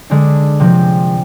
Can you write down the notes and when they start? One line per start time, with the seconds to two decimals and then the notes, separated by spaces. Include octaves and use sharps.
0.10 D3 G#3 D4
0.60 C3 F3 C4